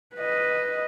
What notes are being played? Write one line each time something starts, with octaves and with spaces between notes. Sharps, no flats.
B4 D#5